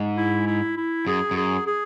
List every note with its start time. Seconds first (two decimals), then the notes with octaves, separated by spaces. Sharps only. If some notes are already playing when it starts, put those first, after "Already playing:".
Already playing: G#2
0.17 E4
0.47 E4
0.77 E4
1.07 F#2 G#4
1.31 F#2
1.37 G#4
1.67 G#4